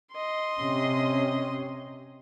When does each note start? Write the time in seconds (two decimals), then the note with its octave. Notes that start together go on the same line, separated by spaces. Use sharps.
0.12 D#5 C6
0.61 C3 C#4